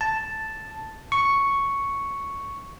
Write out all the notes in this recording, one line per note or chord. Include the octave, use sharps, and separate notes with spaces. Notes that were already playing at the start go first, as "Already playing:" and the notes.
A5
C#6